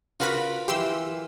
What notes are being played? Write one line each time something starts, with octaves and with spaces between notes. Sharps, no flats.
C#3 F4 F#4 A#4 B4 B5
E3 G4 C6 E6